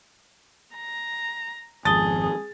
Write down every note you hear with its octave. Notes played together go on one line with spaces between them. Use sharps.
A#5
G#1 F2 G#4 A5 D#6 A6 G7